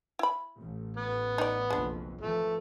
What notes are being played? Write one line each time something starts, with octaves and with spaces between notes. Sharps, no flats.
E4 B5
A1
B3
D#4 D5
F#1 B1 F2 G#3 D4
G#1 E3 F3 A3